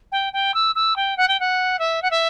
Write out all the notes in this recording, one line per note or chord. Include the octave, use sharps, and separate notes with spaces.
G5
G5
E6
E6
G5
F#5
G5
F#5
E5
F#5
E5